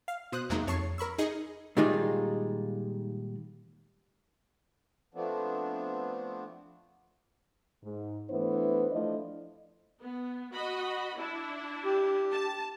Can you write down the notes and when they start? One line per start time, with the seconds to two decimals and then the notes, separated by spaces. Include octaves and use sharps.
0.08 F5
0.32 B2 C5 D#6 F#6
0.50 E2 C3 F#3 G#3 A#3 D#4
0.67 F2 C#5 A5 C#6 C7
0.98 A#4 B5 C#6 E6
1.18 D#4 G#4 D#5 C#7
1.77 A#2 D#3 G3 G#3 D#4 F4
5.14 F3 A3 B3 C4 D4
7.83 G#2
8.30 E3 A3 B3 D4 E4 C5
8.91 F3 A3 D4 E4 D5 D#5
10.01 B3
10.53 F#4 D#5 B5
11.17 D4 E4
11.85 G4
12.32 A5